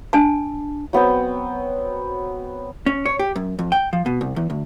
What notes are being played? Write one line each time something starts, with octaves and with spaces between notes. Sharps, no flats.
D4 G#5 A5
F#3 B3 C4 G5
C#4
C#5
G4
F#2
F2
G5
F3
B2
C2
E2
D2